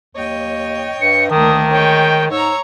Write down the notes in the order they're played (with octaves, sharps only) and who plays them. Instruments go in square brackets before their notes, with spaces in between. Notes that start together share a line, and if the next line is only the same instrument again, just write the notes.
[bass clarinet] D#2 [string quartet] C#5 D#5 G5
[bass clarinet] G2 [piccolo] C#7
[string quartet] D2 A#3 D4 [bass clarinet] D#3 [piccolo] D#6
[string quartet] G#3 C#5 [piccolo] G5
[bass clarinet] G#2 [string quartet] C#5 A#5 [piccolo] E6